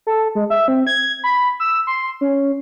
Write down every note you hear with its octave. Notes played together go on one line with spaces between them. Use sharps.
A4
G#3
E5
C4
G#6
B5
E6
C6
C#4